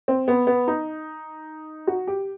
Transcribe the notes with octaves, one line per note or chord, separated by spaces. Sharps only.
C4
B3
B3
D#4
F#4
G4